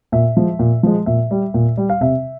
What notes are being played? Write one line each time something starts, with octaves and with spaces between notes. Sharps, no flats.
A#2 E5
F3 G#3
A#2
F3 G#3
A#2 E5
G3
A#2
G3
F5
C3 E5